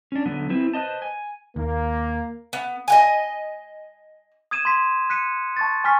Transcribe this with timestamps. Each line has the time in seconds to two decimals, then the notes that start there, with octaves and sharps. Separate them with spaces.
0.12 C#4 D4
0.26 D3 F#3 B3
0.50 C4 E4 B4
0.74 B4 C5 D#5 A5
1.02 G#5
1.56 D#2 A#3
2.53 B3
2.88 D#5 F#5 G#5
4.51 D#6 G#6 D#7 E7
4.65 C6 G#6 B6
5.10 F#6 B6 C#7 D#7
5.57 A5 C#6 A6
5.84 G#5 C#6 F6 B6